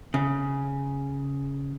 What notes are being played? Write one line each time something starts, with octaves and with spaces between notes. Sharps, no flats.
C#3